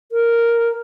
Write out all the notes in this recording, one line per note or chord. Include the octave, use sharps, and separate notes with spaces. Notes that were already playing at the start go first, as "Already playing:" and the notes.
A#4